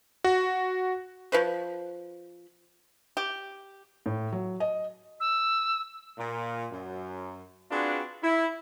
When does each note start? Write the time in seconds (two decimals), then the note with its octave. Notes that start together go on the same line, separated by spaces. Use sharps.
0.24 F#4
1.32 F3 B4 C5
3.17 G4
4.06 A2
4.32 F#3
4.60 D#5
5.20 E6
6.18 A#2
6.71 F#2
7.71 C4 D4 F4 F#4 G#4 B4
8.22 E4